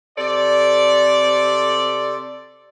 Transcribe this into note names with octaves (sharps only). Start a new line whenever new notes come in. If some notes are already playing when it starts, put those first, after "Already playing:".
C3 A4 C5 D5